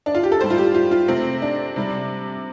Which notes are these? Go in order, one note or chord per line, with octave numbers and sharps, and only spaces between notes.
D4
F4
G4
A4
A2 G3 C5
F4
G4
F4
F4
C3 A3 C4
D4
C3 G3